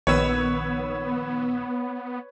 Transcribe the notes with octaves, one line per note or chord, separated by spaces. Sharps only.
A#1 D#3 B3 B4 C#5 E6